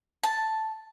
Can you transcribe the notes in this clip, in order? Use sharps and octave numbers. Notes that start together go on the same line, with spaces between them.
A5